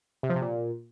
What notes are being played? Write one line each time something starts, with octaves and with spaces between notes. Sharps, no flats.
C3
F3
C3
A#2